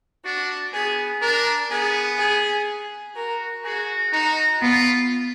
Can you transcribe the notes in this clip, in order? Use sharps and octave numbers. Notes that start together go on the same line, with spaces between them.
D4 F#4
B3 G#4
D4 A#4
B3 G#4
G#4
F#4 A#4
F#4 G#4
D#4 F#4
B3 F4